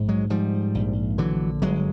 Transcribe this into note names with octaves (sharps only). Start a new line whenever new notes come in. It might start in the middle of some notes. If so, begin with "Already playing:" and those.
Already playing: A#1 G#2
F#3 G#3
G#2 F3 G3
A#1
D3 E3 F#3
G1 F#3 G#3